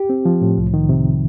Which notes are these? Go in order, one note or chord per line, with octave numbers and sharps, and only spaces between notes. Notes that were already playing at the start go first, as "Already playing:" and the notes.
Already playing: G4
C4
F3
A2
C2
D#3
C3